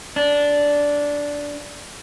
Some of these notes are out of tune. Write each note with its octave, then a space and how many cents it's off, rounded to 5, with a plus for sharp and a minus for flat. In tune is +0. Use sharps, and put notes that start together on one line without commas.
D4 -10